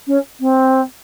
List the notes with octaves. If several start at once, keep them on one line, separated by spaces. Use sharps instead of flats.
C#4
C4